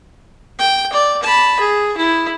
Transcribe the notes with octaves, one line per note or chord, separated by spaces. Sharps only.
G5
D5
A5 B5
G#4
E4